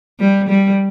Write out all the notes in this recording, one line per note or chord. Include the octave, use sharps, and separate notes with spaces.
G3
G3